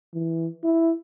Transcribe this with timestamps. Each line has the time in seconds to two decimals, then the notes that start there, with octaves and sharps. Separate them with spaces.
0.14 E3
0.64 E4